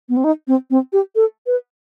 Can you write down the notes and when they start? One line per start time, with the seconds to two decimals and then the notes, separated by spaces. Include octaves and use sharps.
0.09 B3
0.17 C4
0.24 D#4
0.48 C4
0.70 C4
0.93 G4
1.15 A4
1.46 B4